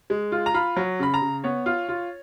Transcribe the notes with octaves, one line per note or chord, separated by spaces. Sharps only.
G#3
F4
A#5
F4 B5
F#3
C#3 B5
A#5
C#3
B3 C#5
F4
F4